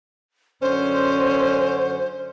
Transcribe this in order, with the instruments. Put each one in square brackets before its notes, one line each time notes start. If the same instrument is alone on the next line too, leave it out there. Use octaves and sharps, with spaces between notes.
[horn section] F#2 D3 C#4 [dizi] C5